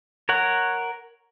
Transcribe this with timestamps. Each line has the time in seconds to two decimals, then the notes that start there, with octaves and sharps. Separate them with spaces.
0.29 A#4 C#5 F#5